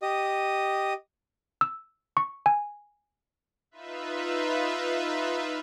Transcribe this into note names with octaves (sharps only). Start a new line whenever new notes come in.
G4 D#5 D#6
E6
C#6
G#5
D#4 F4 B4 E5